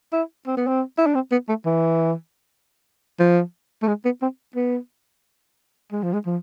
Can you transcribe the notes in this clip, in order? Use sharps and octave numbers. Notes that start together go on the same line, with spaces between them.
E4
C4
B3
C4
E4
D4
C4
B3
A3
E3
F3
A3
G#3
B3
C4
B3
G#3
F3
G#3
F3